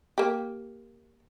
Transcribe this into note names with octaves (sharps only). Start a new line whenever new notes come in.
A#3 G4